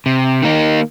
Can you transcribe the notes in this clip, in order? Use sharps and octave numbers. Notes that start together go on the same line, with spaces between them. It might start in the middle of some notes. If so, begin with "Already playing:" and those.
C3
D#3 A#3 D#4